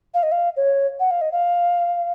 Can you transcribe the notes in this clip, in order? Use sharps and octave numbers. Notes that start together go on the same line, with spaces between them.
F5
D#5
F5
C#5
F#5
F5
D#5
F5